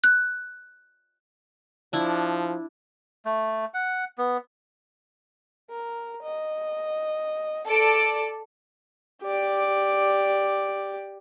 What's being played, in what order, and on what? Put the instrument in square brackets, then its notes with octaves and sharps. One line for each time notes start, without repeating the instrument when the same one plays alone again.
[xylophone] F#6
[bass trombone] F3 [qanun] D4 E4
[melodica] A3
F#5
B3
[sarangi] A#4
D#5
[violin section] A4 D5 D7 [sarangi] A5
[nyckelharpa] G4 D5